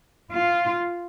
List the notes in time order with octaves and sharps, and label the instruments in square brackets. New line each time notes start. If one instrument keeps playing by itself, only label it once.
[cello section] F4